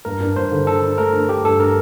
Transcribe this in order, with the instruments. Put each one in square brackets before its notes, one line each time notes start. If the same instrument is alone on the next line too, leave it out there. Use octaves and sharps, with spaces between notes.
[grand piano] G2 [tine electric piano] A#4
[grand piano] D4
[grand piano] G2 [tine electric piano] C5
[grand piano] D3
[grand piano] D3 [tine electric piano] A4
[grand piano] D4
[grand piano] A3 [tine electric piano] A#4
[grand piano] D4
[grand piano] A3 [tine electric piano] G4
[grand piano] G2 [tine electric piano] A4
[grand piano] D4 [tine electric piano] A#4